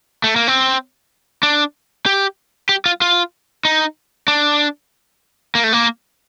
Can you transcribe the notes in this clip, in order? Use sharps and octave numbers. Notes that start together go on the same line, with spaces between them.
A3
A#3
C4
D4
G4
G4
F4
F4
D#4
D4
A#3
A3
A#3